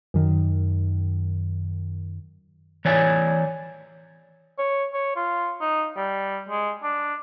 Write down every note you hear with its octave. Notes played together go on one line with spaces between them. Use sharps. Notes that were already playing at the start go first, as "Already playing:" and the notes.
F#2 D#3
E3 C#5 D5 G#5
C#5
C#5
F4
D#4
G3
G#3
D4